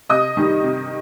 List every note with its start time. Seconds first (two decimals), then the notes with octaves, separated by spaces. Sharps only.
0.09 C3 D#5 D#6
0.37 D#3 G3
0.64 C3